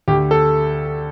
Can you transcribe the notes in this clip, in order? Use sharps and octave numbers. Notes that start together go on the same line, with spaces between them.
D2 G4
A4